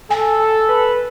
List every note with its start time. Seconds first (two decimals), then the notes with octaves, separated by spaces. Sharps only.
0.11 A4 G#5
0.69 B4